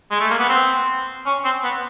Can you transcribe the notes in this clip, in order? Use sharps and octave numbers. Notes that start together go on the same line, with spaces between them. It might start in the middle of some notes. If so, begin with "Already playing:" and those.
G#3
A3
A#3
B3
C4
C#4
C4
B3